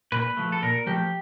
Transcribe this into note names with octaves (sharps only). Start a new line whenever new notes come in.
A#2 B4
F3 A3
A4
A#2 A#4
F3 A3 G4